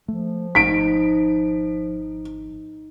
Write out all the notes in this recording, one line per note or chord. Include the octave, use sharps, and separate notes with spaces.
F3 A3
G#1 D#4 B6 D7